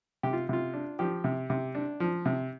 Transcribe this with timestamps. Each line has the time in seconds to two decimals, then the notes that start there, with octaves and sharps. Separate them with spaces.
0.23 C3 G4
0.33 F4
0.49 C3 F4
0.73 D4
0.99 F3 G4
1.24 C3
1.50 C3
1.75 D4
2.00 F3
2.26 C3